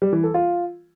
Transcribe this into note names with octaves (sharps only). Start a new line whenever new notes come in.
G3
E3
A4
F4